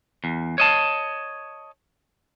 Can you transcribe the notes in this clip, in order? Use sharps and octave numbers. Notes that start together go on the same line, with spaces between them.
E2
C#5 D#5 A5